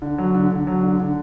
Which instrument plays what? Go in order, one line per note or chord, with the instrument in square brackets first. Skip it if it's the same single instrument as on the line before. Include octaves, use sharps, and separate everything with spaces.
[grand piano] D3
F#3
D3
D3
F#3
D3
D3